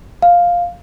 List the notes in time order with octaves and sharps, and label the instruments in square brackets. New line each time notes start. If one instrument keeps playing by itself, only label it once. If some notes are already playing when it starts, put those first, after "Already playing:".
[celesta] F5